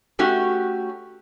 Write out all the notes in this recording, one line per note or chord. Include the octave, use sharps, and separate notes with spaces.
A3 C#4 F#4 G4